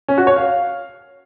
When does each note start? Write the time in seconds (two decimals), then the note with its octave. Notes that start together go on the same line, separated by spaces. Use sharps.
0.08 C#4
0.18 F#4
0.27 C#5
0.36 F5